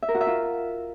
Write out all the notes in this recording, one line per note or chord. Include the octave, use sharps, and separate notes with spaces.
E5
A#4
F#4
E5
F4